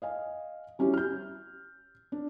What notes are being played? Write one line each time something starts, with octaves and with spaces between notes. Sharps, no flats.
D#5 F5 G#5
G3 C#4 E4 F#4 G4
F6 G6
D4